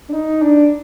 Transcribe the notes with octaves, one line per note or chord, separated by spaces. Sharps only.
D4
D#4
D4